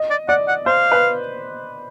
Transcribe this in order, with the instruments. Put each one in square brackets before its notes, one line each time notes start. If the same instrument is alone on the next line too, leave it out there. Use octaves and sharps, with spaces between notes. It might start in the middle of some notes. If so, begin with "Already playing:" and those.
Already playing: [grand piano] D#5
[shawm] D5
[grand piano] D5 [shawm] F#5
[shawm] F#5
[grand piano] C5 [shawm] F5
[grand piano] B4